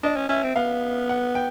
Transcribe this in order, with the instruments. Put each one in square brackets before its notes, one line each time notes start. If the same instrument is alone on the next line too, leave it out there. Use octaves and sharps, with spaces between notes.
[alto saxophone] D4 [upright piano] D#5
[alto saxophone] C#4
[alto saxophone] C#4 [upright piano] E5
[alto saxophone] C4
[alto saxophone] B3 [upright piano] F5
[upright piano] F#5
G5